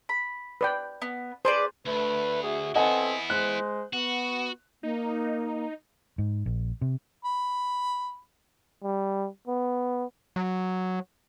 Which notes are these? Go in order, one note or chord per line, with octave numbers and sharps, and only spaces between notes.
B5
B4 D5 G5
B3
G#4 B4 C5 D5
D2 A3 B4
F#4 G#4 E5
B3 C4 E4 A4 B4 D#5 F#5 G#5
G#3 C5 F#6
B3 F#4
A#3 D#4
G#2
A#1
C3
B5
G3
B3
F#3